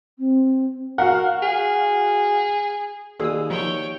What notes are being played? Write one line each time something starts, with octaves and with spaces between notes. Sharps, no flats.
C4
F#4 A#4 F5 F#5
G#4
D#2 F#4 G#4 D5 D#6 E6
D#3 F3 D#4 C#5 G5